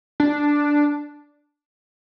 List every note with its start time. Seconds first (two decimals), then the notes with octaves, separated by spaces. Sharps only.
0.20 D4